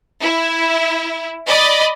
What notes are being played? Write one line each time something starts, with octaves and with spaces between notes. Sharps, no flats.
E4
D5 D#5 B5